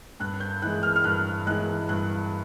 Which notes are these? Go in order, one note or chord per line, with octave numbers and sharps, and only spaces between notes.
G2 F#6
G6
E3 G#3 F#6
F6
F6
G2 F#6
E3 G#3 F#6
G2 F#6